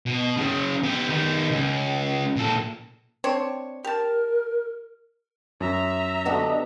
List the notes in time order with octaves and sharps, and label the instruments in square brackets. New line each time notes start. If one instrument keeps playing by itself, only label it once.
[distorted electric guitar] B2
C#3 F#3
B3 G4
D#3 B3
C#2
A#2 A4
[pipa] C4 D4 C#5
[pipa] G4 A5 [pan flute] A#4
[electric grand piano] F#2 [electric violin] E5 A#5
[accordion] D3 D4 D#5 [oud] B3 F#4 G4